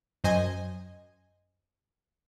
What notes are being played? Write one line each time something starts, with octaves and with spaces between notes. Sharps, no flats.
F#2 C5 D#5 G#5